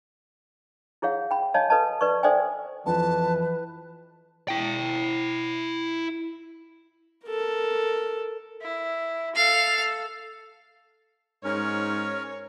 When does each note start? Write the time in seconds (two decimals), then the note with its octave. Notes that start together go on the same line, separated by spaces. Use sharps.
1.02 E4 G#4 C#5 F5 F#5
1.31 G5 B5
1.54 C#5 D#5 F5 G#5 A5
1.70 A4 B4 D#5 A5
2.01 B4 D5 C#6
2.23 A4 C5 D5 E5 G5 G#5
2.86 F2 E3 B4 A5
4.48 E4 G5
7.26 A4 A#4
8.62 E4
9.36 A4 F5
11.44 G#2 C#4 A#4 C#5